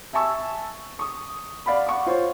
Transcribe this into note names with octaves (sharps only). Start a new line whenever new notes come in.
E5 G#5 A5 C#6 E6
C#6 D#6
D5 F5 F#5 B5
F#5 C#6 D6
F4 C5 C#5